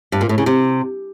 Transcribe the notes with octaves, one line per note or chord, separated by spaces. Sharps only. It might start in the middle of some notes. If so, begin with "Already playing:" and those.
G2
A#2
A2
C#3
C3